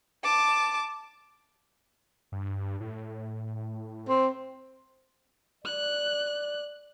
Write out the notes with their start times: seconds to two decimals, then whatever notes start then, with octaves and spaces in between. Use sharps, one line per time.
0.24 A5 D6
2.32 G2
2.80 A2
4.09 C4
5.65 D5 F#6